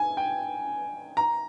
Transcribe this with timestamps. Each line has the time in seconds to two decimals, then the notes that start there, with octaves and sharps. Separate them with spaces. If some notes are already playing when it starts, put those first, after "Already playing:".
Already playing: G#5
0.17 G5
1.17 A#5